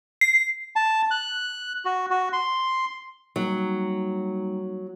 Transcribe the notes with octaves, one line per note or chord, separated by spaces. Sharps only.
C7
A5
F#6
F#4
F#4
C6
F#3 G3 A#3 D#4